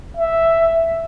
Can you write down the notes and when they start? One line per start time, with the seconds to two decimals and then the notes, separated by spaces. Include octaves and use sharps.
0.17 E5